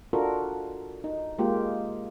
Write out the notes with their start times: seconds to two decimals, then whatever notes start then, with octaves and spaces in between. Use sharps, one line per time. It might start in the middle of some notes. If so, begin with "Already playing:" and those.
0.13 D4 F4 F#4 A4 A#4
1.04 D#4
1.38 G#3 A#3 F4 G4